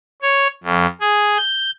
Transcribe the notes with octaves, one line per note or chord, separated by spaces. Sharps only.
C#5
F2
G#4
G6